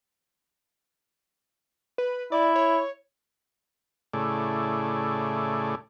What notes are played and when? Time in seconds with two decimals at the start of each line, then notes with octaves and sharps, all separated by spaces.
1.98 B4
2.32 E4 D5
2.56 C#5
4.14 A2 C#3 A3 E4 G#4 D5